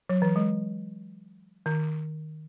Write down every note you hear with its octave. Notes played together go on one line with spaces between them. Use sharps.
F#3
E3
G#3
D#3